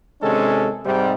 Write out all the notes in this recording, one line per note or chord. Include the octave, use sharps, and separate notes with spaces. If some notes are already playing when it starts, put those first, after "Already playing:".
C3 D#3 G#3 C#4 D4 A4
G#2 C3 G3